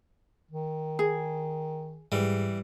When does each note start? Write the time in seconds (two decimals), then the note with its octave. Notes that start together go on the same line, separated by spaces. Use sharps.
0.51 D#3
0.99 G#4
2.12 G#2 E3 G3